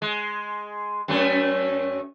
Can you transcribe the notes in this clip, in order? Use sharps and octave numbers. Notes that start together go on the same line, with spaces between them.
G#3
F#2 A3 C#4